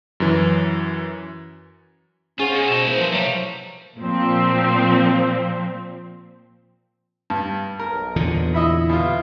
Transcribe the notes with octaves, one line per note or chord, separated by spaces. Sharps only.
F#2 E3
C#4 F4 G#4 C5 F#5
B2
B2 D#4 E5
A#3 E4 B4
F3
C3 F#3 G3 A3 F5
A#2 F3 C4
G2 A5
B1 A#4
E2 A#2 D3
E4 D#5 E5 B5
B2 F4